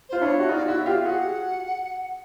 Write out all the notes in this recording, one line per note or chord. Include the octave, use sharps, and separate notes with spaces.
F4 C5
D4 E4 C#5
F#4
D#4 F4 D5
E4 F#4 E5
F4 G4 F5
F#4 G#4 F#5